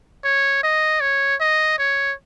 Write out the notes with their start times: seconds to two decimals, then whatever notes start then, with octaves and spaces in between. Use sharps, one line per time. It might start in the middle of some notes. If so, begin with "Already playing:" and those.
0.24 C#5
0.63 D#5
1.00 C#5
1.40 D#5
1.79 C#5